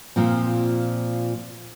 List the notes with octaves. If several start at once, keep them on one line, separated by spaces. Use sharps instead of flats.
A#2 F3 C4